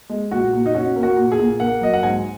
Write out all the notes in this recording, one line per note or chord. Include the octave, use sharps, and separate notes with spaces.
G#3
A#2 F#4
A#2
D#4
C#4 F#4
A#3
F#4
A#2
G#4
A#2
A#3 F#5
F#3 D#5
F#5
G#2 G#5